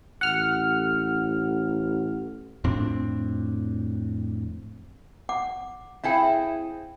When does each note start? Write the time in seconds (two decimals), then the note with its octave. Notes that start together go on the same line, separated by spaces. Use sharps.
0.21 A1 F#5 F6
2.64 F2 A2 C4 D4
5.29 F#5 D6
6.04 C4 E4 G#4 F5 G5